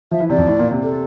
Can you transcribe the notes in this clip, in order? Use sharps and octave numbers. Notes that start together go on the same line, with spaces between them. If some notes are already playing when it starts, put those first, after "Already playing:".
F3 E5
E3
C3 D5
F2
A2
A#2
C3
A4